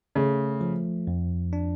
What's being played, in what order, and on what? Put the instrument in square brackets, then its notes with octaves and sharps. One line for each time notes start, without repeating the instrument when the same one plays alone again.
[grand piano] C#3 [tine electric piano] A3
[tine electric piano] F3
F2
D4